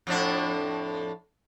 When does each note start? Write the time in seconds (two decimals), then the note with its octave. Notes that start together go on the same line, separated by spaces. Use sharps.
0.07 F2 A2 D4